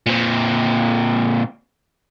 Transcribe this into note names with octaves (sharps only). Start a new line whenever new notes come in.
A#2 C4